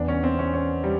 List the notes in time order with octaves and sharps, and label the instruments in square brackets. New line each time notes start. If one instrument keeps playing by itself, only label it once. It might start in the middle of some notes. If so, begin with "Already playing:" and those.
Already playing: [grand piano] E2 [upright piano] D4
[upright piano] C#4
C4
C#4
C#4
G3